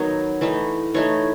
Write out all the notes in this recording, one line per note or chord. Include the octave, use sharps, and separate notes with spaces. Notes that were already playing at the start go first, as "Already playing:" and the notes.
Already playing: D#3 F#3 B3 D#4 C#5
E3 A3 D#4
E3 A3 D#4 C#5